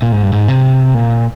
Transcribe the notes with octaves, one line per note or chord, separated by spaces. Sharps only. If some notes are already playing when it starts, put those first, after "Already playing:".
A#2
G#2
G2
G#2
C3
A#2